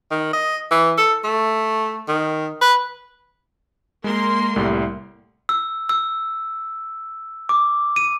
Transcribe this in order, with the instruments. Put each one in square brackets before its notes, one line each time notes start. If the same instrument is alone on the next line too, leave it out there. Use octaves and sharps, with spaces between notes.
[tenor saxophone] D#3
D#5
E3
A4
A3
D#3
B4
[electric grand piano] G#3 [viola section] A#3 A#4 C6
[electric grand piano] C2 A2 G3
[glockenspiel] E6
E6
D6
D#7